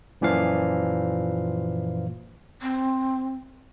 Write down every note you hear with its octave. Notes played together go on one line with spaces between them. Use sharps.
F#2 A#2 E3 F3 F5
C4